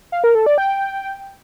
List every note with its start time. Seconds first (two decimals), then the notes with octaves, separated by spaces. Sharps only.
0.12 F5
0.24 A#4
0.35 A4
0.46 D5
0.58 G5